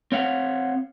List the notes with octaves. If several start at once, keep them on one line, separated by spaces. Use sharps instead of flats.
C4 C#5 F5 F#5